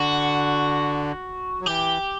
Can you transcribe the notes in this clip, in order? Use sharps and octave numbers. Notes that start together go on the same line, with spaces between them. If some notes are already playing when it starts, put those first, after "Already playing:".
Already playing: D3 F#4
F#3
E3 G4